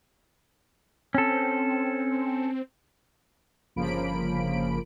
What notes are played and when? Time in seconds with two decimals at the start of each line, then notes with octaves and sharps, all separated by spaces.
1.15 C4 C#4 A4
3.76 G1 C#3 F3 A#3 B5 D7